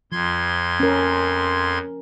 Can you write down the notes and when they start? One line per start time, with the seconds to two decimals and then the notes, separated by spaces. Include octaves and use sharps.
0.12 F2 F3 C6 G#6
0.80 C#4 A#4